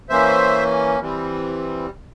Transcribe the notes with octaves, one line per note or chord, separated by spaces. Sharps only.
E3 A#3 C#4 C5 E5
E3 G3 C4